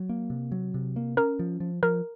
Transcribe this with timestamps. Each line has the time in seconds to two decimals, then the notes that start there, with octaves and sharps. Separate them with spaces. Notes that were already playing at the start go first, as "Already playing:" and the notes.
Already playing: F#3
0.09 A#3
0.30 C3
0.52 F#3
0.74 C3
0.96 A#3
1.17 C#4 A#4
1.39 F3
1.60 F3
1.83 F3 A#4